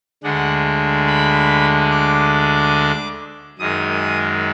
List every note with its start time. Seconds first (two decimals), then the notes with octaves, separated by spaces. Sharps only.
0.23 D2 D3 G#3 D4 F#5
1.07 B5
1.91 D6
3.59 F#2 D#3 G#3 D#6